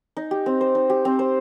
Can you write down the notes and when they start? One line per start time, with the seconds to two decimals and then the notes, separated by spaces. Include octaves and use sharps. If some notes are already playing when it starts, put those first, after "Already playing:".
0.17 D#4
0.31 G4
0.46 C4
0.61 C5
0.75 D#4
0.90 G4
1.05 C4
1.19 C5